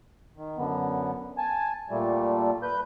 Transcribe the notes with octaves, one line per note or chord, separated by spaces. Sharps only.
D#3
F#2 D3 B3
G#5 A5
A#2 G3 A3
B4 G6